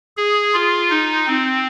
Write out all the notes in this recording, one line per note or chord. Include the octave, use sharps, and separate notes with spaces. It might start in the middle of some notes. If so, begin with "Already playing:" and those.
G#4
F4
D#4
C4